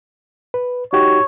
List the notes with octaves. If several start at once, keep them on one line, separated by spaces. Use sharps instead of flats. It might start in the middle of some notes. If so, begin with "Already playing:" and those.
B4
D#4 F#4 G4 C#5